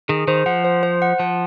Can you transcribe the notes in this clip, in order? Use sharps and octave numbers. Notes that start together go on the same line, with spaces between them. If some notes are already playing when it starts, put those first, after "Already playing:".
D#3 G#4
D#3 C5
F3 F#5
C5
C5
F#5
F3 F#5